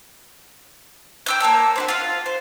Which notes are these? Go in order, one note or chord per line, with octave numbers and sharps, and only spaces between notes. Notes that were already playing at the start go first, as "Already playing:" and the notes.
G5 E6 G6
A#3 C#5 A5 E6
C4 E4 F#4
F4 F5
C5